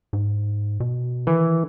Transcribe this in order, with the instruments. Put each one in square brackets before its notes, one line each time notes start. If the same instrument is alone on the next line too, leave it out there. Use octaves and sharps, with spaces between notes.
[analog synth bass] G#2
B2
[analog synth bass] D#3 [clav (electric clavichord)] E3